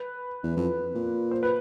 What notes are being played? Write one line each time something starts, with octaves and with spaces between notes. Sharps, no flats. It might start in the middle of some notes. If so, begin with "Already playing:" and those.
Already playing: B4
E2
F2
A#2
C5
B4